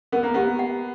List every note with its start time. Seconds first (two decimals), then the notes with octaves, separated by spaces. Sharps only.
0.12 B3 A#4
0.23 A#3
0.34 B3 G4
0.59 F#5